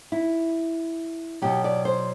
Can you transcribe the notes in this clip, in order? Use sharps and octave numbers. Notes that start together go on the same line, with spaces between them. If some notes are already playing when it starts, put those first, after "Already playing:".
E4
B2 F#3 G4
D5
C5